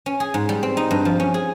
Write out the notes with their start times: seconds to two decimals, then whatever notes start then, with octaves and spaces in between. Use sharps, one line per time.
0.06 C#4
0.20 G#4
0.34 G#2
0.49 G3
0.63 C4
0.77 D#4
0.91 G2
1.05 F3
1.20 C#4
1.34 G#4